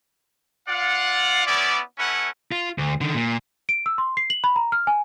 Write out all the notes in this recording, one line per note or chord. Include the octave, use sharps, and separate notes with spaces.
F4 D5 F5 F#5
B3 C#4 E4 D5
A3 C#4 E4 B4 F#5
F4
D2
D3 D#3
A#2
D7
E6
C6
C7
F#7
B5
A#5
F6
G#5